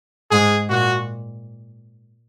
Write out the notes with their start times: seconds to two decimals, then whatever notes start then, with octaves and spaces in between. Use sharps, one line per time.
0.31 G#2 G#4
0.69 A#2 F#4